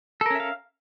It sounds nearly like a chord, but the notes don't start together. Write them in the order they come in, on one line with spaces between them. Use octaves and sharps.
A4 A#4 C#4 E5 F5